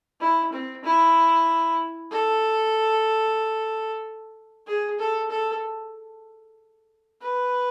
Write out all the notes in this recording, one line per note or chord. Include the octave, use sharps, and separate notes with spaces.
E4
C4
E4
A4
G#4
A4
A4
B4